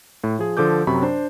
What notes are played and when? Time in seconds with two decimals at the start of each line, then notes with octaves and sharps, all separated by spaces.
0.24 A2
0.39 F3 G#4
0.57 D3 F3 A4 D6 G6
0.87 F#2 C3 F#3 B5 C#6
1.02 D4 C5